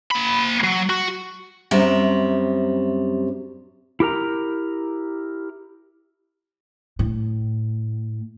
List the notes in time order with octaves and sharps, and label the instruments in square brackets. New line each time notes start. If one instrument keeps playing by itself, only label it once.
[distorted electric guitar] A#3 B5
F#3
F#4
[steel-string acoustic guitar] F#2 C3 G3 E5
[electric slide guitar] E4 G4 A#4 A#5
[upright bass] A2